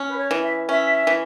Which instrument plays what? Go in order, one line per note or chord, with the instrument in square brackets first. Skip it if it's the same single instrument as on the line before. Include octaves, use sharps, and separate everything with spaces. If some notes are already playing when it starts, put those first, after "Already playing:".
Already playing: [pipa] C#4
[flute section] B4
C#5
[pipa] E3
[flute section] E5
[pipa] C#4 [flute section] E5
[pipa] E3